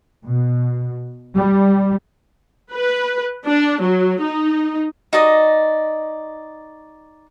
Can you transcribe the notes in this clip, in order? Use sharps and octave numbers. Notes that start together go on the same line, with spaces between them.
B2
G3
B4
D4
F#3
D#4
D#4 F#4 D5 D#5